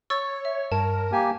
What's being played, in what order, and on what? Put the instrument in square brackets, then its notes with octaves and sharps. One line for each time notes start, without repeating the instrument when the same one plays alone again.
[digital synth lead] C#5 [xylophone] C#6 E6 A6
[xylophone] E5
[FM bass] G2 [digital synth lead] A#4 [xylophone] A5
[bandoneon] A#3 G4 G#5